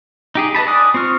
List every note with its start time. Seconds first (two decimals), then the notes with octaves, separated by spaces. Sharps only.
0.35 D#4 G4 G#4
0.55 B4 D#5 A5 B5
0.66 D5 G#5 D6 D#6 F#6
0.94 C4 F4 C#6 F6